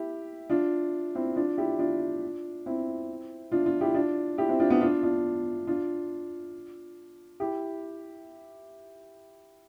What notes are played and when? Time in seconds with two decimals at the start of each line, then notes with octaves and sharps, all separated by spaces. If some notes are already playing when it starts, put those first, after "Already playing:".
Already playing: E4 G4
0.50 D4 F4
1.15 C4 E4
1.36 D4 F4
1.58 E4 G4
1.79 D4 F4
2.66 C4 E4
3.52 D4 F4
3.66 D4 F4
3.81 E4 G4
3.95 D4 F4
4.38 E4 G4
4.49 C4 E4
4.60 D4 F4
4.70 B3 D4
4.81 D4 F4
5.03 D4 F4
5.67 D4 F4
7.40 E4 G4